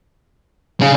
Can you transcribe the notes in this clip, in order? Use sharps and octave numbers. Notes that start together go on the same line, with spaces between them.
C#3